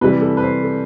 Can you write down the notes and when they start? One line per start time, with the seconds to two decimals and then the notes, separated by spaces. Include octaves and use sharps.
0.01 C3 E3 G3 B4
0.21 A4
0.37 B4
0.43 C5
0.64 A4